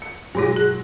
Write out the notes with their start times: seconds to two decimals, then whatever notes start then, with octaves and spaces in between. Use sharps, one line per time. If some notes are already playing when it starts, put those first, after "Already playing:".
0.02 C#7
0.35 G2 B2 F#3 G#3 E4 A#6
0.56 G#4 F#6